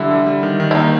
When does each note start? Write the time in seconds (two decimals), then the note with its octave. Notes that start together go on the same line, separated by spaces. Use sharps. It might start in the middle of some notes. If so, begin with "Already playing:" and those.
Already playing: D3 G3 E4
0.11 G3
0.26 G3
0.43 D#3
0.60 D#3
0.71 E4
0.75 A#3 D#4